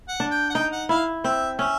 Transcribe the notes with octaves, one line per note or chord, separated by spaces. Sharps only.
F#5
D4
G5
F#5
D#4 G5
F#5
E4 F5
C4 E5
C#4 E5